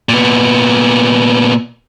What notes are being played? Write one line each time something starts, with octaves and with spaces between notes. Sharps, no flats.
A#2 B3